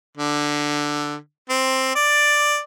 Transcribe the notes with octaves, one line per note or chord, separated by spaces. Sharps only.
D3
C4
D5